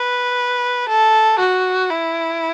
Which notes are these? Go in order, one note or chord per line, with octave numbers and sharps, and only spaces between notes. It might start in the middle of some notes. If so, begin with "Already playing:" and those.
Already playing: B4
A4
F#4
E4